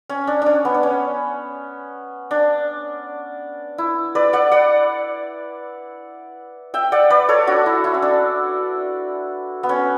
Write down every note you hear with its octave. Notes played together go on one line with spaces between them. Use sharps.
C#4
D4
C#4 D4
B3
D4
C#4
D4
E4
B4 D5
D5 F#5
D5 F#5
E5 G5
D5 F#5
B4 D5
A4 C#5
D4 F#4
E4
E4
C#4
D4
B3
C#4